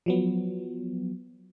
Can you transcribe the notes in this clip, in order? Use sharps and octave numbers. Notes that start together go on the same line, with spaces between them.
F3 F#3 B3